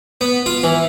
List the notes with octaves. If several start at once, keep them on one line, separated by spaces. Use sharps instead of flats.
B3
F4
E3